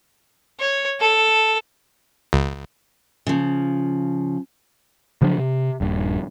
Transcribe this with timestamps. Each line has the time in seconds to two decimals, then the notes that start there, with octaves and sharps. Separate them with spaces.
0.60 C#5
1.00 A4
2.33 C#2
3.27 C#3 F3
5.22 C#3 F3 F#3 D4
5.38 C3
5.81 D#1 G2